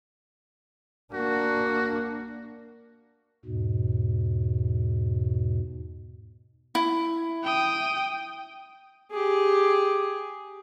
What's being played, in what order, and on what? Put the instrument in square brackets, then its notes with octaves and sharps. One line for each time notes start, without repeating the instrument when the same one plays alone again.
[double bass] A#3 D4 [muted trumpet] F#4
[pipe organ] E2 G#2 B2
[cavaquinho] E4
[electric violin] G5 D#6
[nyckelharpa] G4 G#4